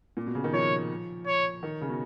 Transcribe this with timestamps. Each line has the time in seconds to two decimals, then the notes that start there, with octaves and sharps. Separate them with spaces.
0.17 A#2
0.26 B2
0.35 C#3
0.44 D#3
0.53 F3 C#5
1.26 C#5
1.63 D#3
1.81 C#3
1.89 B2